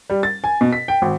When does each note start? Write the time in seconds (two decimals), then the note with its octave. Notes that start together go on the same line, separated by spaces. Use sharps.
0.10 G3
0.23 A6
0.44 G#5
0.61 B2
0.73 B6
0.88 G5
1.02 G#1